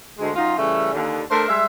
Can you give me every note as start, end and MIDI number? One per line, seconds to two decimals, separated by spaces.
0.19 0.30 38
0.19 0.30 56
0.35 0.54 42
0.35 0.54 63
0.35 0.54 65
0.57 0.92 49
0.57 0.92 52
0.57 0.92 55
0.57 0.92 57
0.57 0.92 61
0.92 1.21 39
0.92 1.21 50
1.30 1.44 57
1.30 1.44 62
1.30 1.44 70
1.30 1.44 72
1.48 1.66 55
1.48 1.66 56
1.48 1.66 76